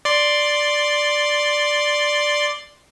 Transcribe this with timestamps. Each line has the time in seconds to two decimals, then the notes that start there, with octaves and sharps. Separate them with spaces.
0.05 D5 C6